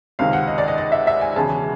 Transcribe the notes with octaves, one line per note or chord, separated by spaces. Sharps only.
C#2 C3 D#3 F5
F#5
D#5
D5
D#5
D#5
E5
E5
G#5
E1 E2 C#3 A5